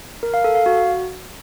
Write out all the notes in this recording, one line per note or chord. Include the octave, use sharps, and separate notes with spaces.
A#4
F5
A4
F5
F#4